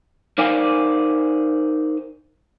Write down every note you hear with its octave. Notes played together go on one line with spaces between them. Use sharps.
D#4 A#4 C5 D5 F5 G#5